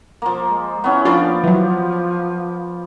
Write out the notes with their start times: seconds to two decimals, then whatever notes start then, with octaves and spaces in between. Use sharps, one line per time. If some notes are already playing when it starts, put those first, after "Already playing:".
0.22 F3 A#3
0.48 G#3
0.84 B3 C#4 E4
1.05 F3 A#3 D4 F4 D5
1.44 E3 F#3